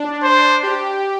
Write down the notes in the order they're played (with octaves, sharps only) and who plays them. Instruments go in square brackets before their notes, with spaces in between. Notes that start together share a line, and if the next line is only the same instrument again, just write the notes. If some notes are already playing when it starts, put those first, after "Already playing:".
Already playing: [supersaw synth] D4
[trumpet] C5
[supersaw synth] G4